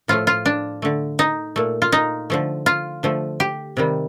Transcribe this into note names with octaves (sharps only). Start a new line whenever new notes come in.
A2 F3 A3 F4
F4
D4
D3 A3
D#4
A#2 A3
F4
D#4
D3 F3 A3
F4
D3 F3 A3
G4
C3 D#3 G3